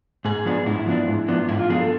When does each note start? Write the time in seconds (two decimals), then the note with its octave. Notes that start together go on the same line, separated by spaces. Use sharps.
0.25 G#2 G#4
0.45 F3 B3 D4
0.66 G#2 E4
0.86 F3 B3 D4
1.07 G#2
1.28 F3 B3 D4
1.49 G#2 E4
1.59 F4
1.69 F3 B3 D4 G#4
1.81 A4